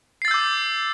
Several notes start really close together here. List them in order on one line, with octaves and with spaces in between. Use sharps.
C7 A6 E6 G6 D6